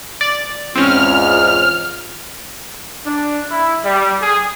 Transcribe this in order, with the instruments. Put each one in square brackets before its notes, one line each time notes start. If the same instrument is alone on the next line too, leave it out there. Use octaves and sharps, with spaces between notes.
[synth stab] D5
[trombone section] E2 G#2 [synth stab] C4 C#4 [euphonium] F4 [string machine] F6
[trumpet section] D4
E4
G3
G#4